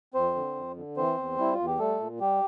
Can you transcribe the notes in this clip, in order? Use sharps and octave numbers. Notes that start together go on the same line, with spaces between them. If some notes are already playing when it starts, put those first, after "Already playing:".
F2 C4 C5
D3
F2
D3
E3 C4 C5
E2
G3 E4
F4
E2
G4
G3 A3 A4
A#2
G3 G4